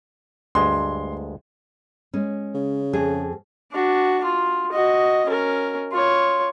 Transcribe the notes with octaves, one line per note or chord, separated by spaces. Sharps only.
D2 G2 G#3 C6
G#3 C#4
C#3
F2 G#4
D4 F#4
F4
F#4 D#5
C#4 A#4
F4 C#5